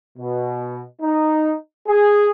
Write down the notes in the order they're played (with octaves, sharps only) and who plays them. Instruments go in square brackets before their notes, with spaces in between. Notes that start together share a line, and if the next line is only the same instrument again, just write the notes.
[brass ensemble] B2
D#4
G#4